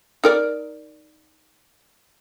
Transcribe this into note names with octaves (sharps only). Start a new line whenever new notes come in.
D#4 A#4 D5